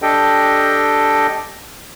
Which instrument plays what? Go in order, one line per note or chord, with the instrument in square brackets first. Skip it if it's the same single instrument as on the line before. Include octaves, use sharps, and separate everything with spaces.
[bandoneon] D4 G4 A4 D#5 G5